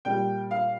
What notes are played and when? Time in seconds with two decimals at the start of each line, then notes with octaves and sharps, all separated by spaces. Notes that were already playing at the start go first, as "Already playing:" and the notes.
0.05 A#2 G3 G5
0.51 F5